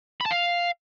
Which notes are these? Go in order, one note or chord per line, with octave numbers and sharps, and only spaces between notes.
B5
A5
F5